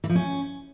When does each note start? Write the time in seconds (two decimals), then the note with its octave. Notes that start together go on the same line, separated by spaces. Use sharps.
0.04 E3
0.10 F3
0.15 C#4